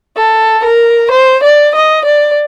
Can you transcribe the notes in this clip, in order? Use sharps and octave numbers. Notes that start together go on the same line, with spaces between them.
A4
A#4
C5
D5
D#5
D5